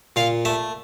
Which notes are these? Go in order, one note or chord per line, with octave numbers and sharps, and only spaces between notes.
A#2 F5
A3 E5